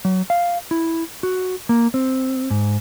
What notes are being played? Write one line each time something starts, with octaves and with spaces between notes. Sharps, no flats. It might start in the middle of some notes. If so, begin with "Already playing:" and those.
F#3
F5
E4
F#4
A#3
C4
G#2